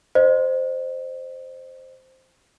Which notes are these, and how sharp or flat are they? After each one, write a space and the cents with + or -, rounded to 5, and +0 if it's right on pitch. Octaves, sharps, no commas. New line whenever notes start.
C5 +0 D#5 -30